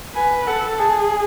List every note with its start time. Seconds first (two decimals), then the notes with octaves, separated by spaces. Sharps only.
0.15 B4 G#5
0.47 A4 F#5
0.79 G#4 A5